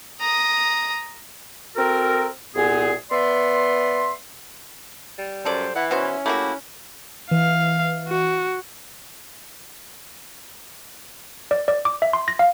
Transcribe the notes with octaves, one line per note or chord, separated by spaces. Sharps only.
A#5 D#6
C4 F#4 A4 A#4
C2 A#2 B3 G#4
B3 D5 E5 C6
G3
F#2 A4 C5 D5
E3 E4 F#5
B2 C#4 F#4 C5
A3 A#3 E4 F#4 G4
E3 F5
F#4
D5
D5
D6
E5
C6
A#6
F5